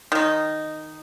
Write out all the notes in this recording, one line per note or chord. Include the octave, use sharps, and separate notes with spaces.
D#3 D#4